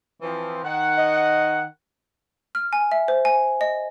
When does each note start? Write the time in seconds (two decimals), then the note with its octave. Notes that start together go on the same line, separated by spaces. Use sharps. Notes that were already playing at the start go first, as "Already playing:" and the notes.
0.22 E3 F3 C4
0.64 D#3 F#5
0.97 D#5
2.55 F6
2.73 G#5
2.92 E5
3.08 C5
3.25 G#5
3.61 D#5